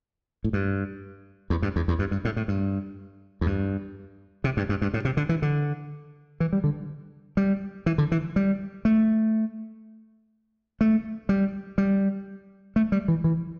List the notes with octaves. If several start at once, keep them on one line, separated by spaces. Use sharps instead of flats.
A2
G2
E2
G2
E2
E2
G2
G2
A2
A2
G2
E2
G2
C3
G2
G2
G2
A2
C3
D3
E3
D3
E3
G3
D3
G3
E3
D3
E3
G3
A3
A3
G3
G3
A3
G3
E3
E3